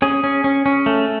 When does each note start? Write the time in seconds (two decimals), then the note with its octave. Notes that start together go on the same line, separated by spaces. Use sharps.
0.02 C#4 G#4
0.24 C#4
0.44 C#4
0.66 C#4
0.86 A3